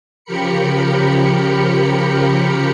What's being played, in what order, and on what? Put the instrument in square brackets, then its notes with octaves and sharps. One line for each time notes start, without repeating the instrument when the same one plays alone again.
[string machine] C#3 F3 G4 A#4 B5 C#7